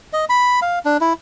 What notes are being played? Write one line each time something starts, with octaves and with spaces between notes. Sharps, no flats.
D#5
B5
F5
D4
E4